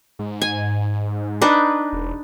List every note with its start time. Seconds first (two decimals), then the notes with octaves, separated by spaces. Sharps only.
0.19 G#2
0.42 G#5
1.41 D4 D#4 B4
1.93 E1